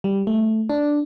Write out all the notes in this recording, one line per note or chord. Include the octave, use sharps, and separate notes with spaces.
G3
A3
D4